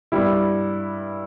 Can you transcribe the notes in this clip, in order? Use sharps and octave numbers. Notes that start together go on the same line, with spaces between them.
G2 G3 E4